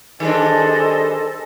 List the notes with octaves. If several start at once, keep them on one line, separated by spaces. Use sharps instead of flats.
D#3 G3 D4 G#4 A4 C5 D#5